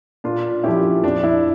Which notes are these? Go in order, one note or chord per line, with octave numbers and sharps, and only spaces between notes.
A#2 D4 F4
F3 C#4 E4 G4
F2 D4
E4